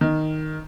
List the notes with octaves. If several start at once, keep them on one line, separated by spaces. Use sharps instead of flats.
D#3